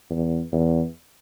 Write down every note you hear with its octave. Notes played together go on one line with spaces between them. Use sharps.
E2
E2